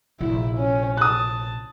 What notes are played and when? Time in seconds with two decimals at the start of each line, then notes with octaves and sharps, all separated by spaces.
0.21 A#1 C3 E4
0.57 C#4
0.97 A5 D#6 F#6